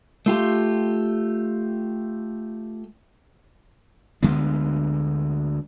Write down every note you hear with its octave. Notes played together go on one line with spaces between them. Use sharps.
A3 F4 G4
D2 D3 G#3 B3